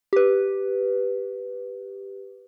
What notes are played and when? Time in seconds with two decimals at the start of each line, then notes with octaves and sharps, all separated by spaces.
0.13 G4 B4